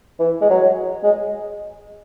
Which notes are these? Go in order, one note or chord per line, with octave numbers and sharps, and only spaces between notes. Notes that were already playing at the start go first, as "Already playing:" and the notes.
E3
G#3
F#3
G#3